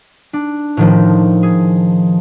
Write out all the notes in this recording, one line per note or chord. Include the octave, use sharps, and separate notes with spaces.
D4
A2 D#3 F3
G#4